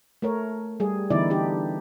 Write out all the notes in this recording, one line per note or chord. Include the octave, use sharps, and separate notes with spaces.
A3 A#4 C#5
G3 G#4
D3 E3 B3 D#4 E4 D5
D4 D#4 G4